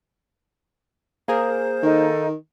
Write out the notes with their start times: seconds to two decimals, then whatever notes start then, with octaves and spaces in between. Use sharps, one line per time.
1.28 A#3 G#4 A#4 C5
1.83 D#3 D#4 A4 F5